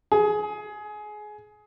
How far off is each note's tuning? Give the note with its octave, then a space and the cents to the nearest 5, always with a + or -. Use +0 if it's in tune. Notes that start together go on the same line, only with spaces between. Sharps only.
G#4 +20